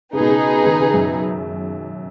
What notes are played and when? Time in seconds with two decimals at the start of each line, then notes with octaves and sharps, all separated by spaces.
0.13 C#3 D#4 G#4 B4
0.20 B2
0.28 C#3
0.63 C#3
0.66 D#3
0.80 C#3
0.94 F#2